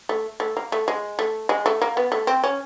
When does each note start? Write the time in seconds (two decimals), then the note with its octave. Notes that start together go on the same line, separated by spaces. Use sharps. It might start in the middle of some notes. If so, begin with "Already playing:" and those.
0.09 A3
0.40 A3
0.57 A#3
0.72 A3
0.88 G#3
1.19 A3
1.49 G#3
1.66 A3
1.82 A#3
1.97 B3
2.12 A3
2.27 C4
2.44 C#4